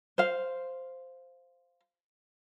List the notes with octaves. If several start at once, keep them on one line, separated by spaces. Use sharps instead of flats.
C5 F5